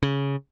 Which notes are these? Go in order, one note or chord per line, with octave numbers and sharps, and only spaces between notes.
C#3